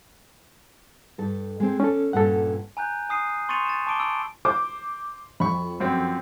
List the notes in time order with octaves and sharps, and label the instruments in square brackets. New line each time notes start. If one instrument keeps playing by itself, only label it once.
[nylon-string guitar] G2 A4
G#3 C4
[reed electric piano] C#4 A4 [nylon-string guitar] D5
[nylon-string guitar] G2 A#2 C#4 [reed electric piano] A4 F#5
[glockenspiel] G#5 A#5 F#6 G6
G#5 D#6 C7 D#7
C6 C#6 A6 C#7 D#7 F7
A6 E7
A5 C#6 D6 D7 D#7 G7
B5 E6 D7
[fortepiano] C5 [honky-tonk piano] D6
[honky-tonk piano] F2 [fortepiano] B5 C#6
[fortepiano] F#2 C4